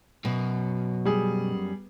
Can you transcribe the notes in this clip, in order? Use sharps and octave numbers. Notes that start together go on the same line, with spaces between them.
F#2 B2
G3 G#4